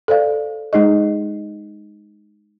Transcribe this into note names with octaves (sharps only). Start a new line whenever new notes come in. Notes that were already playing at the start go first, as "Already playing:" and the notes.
A4 C5 D5 F5
G#3 D#4 G#4 D#5